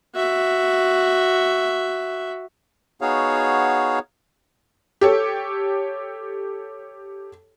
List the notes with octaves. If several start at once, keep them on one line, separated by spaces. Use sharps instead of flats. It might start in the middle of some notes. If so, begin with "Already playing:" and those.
F#4 E5
B3 D#4 F#4 G#4 C#5 F5
G4 A4 C#5